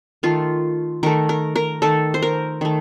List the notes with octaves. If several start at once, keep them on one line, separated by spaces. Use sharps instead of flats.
D#3 A3 F4
D#3 A3 A#4
A#4
A#4
D#3 A3 A4
C5
A#4
D#3 A3